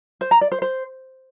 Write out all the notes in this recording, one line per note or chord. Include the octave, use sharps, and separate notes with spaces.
C5
A#5
D5
C5
C5